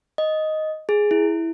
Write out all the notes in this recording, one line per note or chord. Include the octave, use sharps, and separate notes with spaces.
D#5
G#4
E4